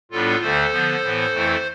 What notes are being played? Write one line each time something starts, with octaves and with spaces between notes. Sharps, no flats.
A2 G3 B3 D4 F4 A4
D2 D3 A3 A4 C5
D3 F3 B3
A2 E3 B3
F2 E3 A3 E4